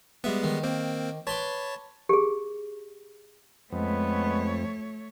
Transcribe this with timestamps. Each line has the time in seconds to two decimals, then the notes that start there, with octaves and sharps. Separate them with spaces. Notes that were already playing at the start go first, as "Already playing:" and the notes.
0.24 G3 G#3 B3 E5
0.44 D#3
0.63 A#3 C4
1.27 B4 C#5 A5 C6 D6
2.09 G4 G#4
3.72 F2 G#3 A3 B3 C#5